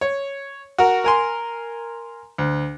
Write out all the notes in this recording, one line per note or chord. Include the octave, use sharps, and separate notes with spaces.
C#5
F#4 A#4
A#4 G#5 C6
D2